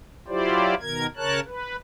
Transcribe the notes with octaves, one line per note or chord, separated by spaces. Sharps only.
F#3 E4 F4 G4 C5 D5
B2 D#3 A#4 G#6
C#3 A#4 C#5 A5 F#6
B4